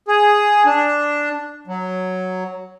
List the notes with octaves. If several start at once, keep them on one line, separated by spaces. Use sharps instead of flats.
G#4
D4
F#3